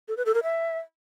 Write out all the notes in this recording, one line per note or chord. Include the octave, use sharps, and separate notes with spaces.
A4
B4
A4
A#4
E5